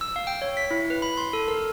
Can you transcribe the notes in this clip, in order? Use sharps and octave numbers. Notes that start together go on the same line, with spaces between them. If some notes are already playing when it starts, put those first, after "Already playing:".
E6
F5
G5
C#5
B6
E4
B4
B5
C6
A4
A#4